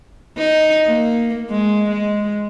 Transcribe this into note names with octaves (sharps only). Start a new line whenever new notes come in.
D#4
A#3
G#3
G#3